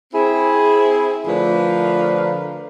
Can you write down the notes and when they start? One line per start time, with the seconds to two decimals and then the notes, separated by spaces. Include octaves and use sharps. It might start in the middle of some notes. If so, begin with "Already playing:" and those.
0.14 C4 E4 G#4
1.27 D3 F3 A3 D4 A#4 B4